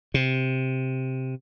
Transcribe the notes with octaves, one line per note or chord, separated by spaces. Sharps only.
C3